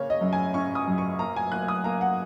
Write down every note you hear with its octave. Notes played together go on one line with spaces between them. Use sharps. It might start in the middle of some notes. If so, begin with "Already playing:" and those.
Already playing: C#3 A#3 C#5
D#5
F#2
G#5
C#4 C#6
D#6
F#2
C#6
A#3 A#5
G#5
A#3 F#6
D#6
A#3 A#5
F#5